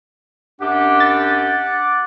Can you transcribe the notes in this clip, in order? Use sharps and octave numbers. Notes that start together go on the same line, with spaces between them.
F#2 D4 G4 F#5 D6
A6